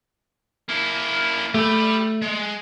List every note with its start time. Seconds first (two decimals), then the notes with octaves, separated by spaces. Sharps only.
0.69 A#3 E4
1.54 A3 G4 B5
2.22 G#3